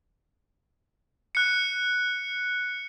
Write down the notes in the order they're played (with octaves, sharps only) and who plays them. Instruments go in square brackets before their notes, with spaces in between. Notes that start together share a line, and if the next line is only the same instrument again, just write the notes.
[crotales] F#6 C#7